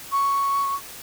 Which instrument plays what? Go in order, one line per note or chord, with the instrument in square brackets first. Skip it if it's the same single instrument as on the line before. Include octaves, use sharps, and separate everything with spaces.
[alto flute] C#6